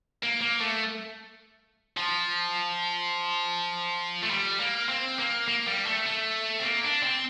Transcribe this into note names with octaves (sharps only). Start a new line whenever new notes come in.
A#3
A#3
A3
F3
A3
G3
A#3
C4
A#3
A#3
G3
A3
A3
C4
A#3
D4
C4